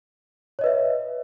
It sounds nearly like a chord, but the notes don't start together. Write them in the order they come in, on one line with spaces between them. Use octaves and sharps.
C#5 D#5 B4 E5